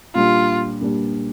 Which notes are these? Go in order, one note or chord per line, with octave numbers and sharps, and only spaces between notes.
A#2 G3 D4 F4
A#2 G3 D4